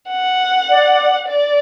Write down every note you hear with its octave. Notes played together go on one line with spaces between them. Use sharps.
F#5
D5
D5